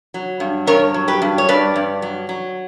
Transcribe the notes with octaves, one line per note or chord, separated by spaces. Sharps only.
F#3
G2
G2 A#4 C#5
F#3
G4 B4
G2
C#5
G2 B4 D5
G2
F#3
F#3